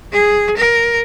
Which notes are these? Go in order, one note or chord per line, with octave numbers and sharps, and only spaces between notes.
G#4
A#4